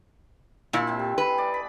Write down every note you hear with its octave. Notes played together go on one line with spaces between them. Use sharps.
A#2 G#3 E4
C3 G#3 C4
G#3
B4
D5
B5